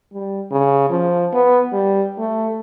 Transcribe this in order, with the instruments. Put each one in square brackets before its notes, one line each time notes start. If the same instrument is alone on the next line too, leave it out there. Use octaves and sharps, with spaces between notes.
[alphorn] G3
C#3
F3
B3
G3
A3